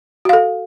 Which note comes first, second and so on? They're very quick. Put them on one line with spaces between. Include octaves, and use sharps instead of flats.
F#4 F5 A4